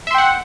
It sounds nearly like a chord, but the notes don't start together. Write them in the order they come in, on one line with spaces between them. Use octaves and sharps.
E5 C6 G5 F#5